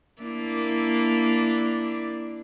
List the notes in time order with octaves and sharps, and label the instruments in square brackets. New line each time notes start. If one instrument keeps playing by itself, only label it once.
[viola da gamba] A#3 D4 E4